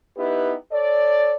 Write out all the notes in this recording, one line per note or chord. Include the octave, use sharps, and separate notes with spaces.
B3 D#4 E4 G4 B4
A4 C#5 D5